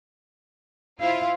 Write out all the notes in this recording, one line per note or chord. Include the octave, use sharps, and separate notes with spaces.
E4 F4 C5 F5